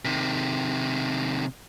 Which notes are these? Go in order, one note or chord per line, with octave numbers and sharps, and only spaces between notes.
C3 D#3